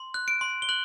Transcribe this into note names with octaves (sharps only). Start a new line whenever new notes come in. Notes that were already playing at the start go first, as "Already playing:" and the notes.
Already playing: C6
F#6
D7
C6
G7
F#6 F#7